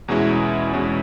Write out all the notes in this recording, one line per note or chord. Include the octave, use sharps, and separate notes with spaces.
E2 B2 G#3 C#4 E4
E2 B2 G#3 C#4 E4